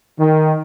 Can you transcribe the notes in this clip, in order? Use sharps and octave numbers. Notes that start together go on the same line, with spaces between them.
D#3